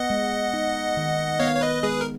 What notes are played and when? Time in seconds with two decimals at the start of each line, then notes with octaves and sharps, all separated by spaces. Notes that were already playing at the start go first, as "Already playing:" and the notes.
Already playing: B3 D#5 F#5
0.10 G#3
0.53 D#4
0.97 D#3
1.39 B3 C#5 F5
1.56 C#5
1.61 B4 D#5
1.83 G#3 G#4 B4
2.01 A#4